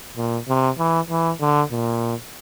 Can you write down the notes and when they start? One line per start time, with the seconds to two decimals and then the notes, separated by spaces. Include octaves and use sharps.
0.17 A#2
0.48 C3
0.78 E3
1.10 E3
1.41 D3
1.71 A#2